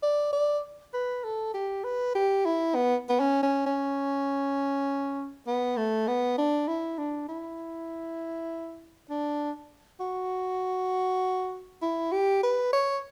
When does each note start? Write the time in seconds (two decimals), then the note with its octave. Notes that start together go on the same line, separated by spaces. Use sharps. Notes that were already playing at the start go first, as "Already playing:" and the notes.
0.03 D5
0.33 D5
0.94 B4
1.24 A4
1.54 G4
1.84 B4
2.15 G4
2.45 E4
2.75 B3
3.09 B3
3.20 C#4
3.43 C#4
3.66 C#4
5.47 B3
5.77 A3
6.08 B3
6.38 D4
6.68 E4
6.98 D4
7.29 E4
9.10 D4
10.00 F#4
11.82 E4
12.12 G4
12.43 B4
12.73 C#5